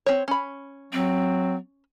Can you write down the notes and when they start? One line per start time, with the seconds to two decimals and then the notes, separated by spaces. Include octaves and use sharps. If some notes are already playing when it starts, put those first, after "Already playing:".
0.06 C4 C#5
0.28 C#4 B5
0.93 F#3 C4